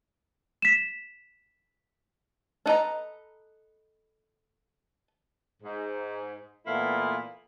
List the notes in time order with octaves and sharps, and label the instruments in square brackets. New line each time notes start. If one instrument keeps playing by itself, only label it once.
[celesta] B6 E7
[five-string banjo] D4 A4 B4 D#5 A#5
[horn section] G#2
A#2 E3 A3 B3 E4 F4